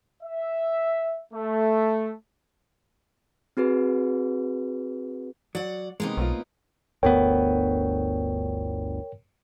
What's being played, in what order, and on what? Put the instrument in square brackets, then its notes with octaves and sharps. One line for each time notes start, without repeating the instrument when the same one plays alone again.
[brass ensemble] E5
A3
[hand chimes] C4 F#4 G#4 B4
[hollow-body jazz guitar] F#3 [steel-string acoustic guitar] D5 F#5
[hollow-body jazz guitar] C3 G#3 [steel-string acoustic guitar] A#3 B3 D#4
[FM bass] B1 [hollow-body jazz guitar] A2 C4 F4
[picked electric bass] G1 D2 B3 [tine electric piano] A#4 C#5 G5